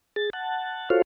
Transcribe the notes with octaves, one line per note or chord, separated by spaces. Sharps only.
G#4 A6
F#5 A5
F4 F#4 A4 C5 C#5 F5